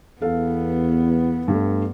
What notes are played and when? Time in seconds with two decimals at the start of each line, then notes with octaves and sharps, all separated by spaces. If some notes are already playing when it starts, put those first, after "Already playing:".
0.22 E2 B3 A4 F5
1.48 G2 A3